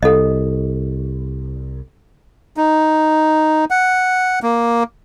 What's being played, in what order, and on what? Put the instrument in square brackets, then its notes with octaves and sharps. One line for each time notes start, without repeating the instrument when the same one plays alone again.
[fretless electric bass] C2 [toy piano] A4 D#5
[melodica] D#4
F#5
A#3